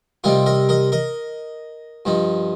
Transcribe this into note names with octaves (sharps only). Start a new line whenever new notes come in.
C3 G3 C4 D#4 F4 A#4
A#4 D#5
A#4 D#5
A#4 D#5
G2 F3 D#4